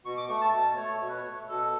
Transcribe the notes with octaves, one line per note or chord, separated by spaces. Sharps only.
B2 C#6
D6
A3 C#6
A5
B2 A5
A3 C#5
B2 C#5
B4
C#5
A3
B2 A4